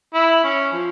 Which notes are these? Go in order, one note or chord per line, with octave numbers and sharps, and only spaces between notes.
E4
C#4
F3